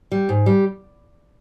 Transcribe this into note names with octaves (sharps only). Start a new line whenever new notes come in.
G3
G#2
G3